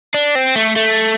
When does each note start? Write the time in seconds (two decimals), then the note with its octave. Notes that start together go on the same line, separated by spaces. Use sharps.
0.14 D4
0.35 C4
0.56 A3
0.76 A3